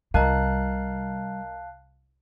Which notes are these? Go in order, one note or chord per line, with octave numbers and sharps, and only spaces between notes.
C2 G3 A#4 D#5 F5 A5 A#5 F#6